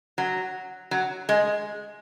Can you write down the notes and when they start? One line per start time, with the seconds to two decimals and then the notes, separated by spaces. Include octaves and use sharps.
0.18 F#3
0.91 F#3
1.29 G#3